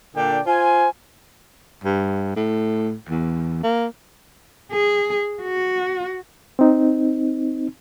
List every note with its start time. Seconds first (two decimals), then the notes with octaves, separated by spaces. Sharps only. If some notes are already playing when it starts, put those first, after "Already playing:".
0.15 A#2 D3 D4 D5 G5
0.46 F4 C5 G#5
1.84 G2
2.36 A2
3.09 E2
3.63 A#3
4.72 G#4
5.42 F#4
6.59 C4 D#4